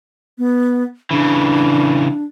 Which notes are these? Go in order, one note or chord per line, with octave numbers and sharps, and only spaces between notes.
B3
C#3 E3 D4